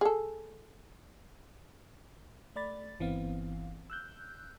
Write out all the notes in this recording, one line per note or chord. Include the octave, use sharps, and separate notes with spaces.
G#4 A4
A3 D5 B5 A6
G1 E3 B3 C4 F5
E6 F#6 G6